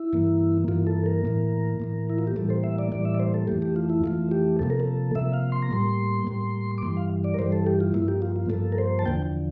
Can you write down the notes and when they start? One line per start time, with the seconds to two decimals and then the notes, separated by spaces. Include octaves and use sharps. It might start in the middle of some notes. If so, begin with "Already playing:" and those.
Already playing: E4
0.13 G2 E3 A#3
0.68 G2 E3 A#3 F4
0.87 A4
1.06 A#4
1.25 A2 E3 A#3
1.80 A2 E3 A#3
2.10 E4
2.18 F4
2.27 G4
2.36 A2 E3 G3 A#3 A4
2.50 C5
2.64 E5
2.78 D5
2.92 A2 E3 G3 A#3 D5
3.05 E5
3.14 D5
3.20 C5
3.34 A4
3.48 F2 E3 A3 G4
3.62 G4
3.76 F4
3.90 E4
4.04 F2 E3 A3 F4
4.31 G4
4.59 C3 F3 A#3 A4
4.70 A#4
4.80 A4
5.15 C3 F3 A#3 E5
5.33 F5
5.52 C6
5.62 A#5
5.71 A2 G3 A#3 C6
6.27 A2 G3 A#3
6.78 D6
6.82 G2 E3 G3 C6
6.97 F5
7.24 D5
7.34 A#4
7.39 G2 E3 G3 C5
7.52 A4
7.67 G4
7.81 F4
7.94 G2 F3 A#3 E4
8.08 G4
8.22 F4
8.36 F4
8.50 G2 F3 A#3 A4
8.72 A#4
8.78 C5
8.99 A5
9.06 E2 D3 F3 G5